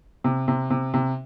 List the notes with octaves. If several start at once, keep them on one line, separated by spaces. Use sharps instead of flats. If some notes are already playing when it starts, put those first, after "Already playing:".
C3
C3
C3
C3